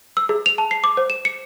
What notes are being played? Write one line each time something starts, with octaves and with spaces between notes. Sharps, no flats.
E6
G#4
F7
A5
C7
D6
C5
E7
C#7